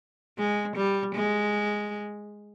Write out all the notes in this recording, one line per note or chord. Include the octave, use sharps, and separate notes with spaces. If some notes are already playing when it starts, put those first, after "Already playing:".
G#3
G3
G#3